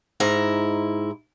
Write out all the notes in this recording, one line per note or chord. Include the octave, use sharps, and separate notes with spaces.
G#2 E4 A#5